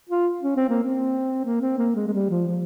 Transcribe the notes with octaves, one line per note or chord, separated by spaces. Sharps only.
F4
C#4
C4
A#3
C4
A#3
C4
A#3
G#3
G#3
G3
F3
F3